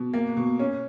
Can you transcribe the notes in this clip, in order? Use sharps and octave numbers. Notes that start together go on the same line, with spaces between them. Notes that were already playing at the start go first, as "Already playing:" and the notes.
Already playing: B2
A#3
B2
C#4